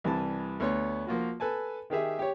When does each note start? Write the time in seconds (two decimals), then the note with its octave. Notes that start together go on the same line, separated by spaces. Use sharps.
0.04 C2 E3 G3 A5
0.60 D2 B3 C#5 C6 C#6
1.07 F3 A#3 F4 F#4
1.40 A4 B4 G#5 A5
1.90 D#3 G4 G#4 E5
2.19 G4 C#5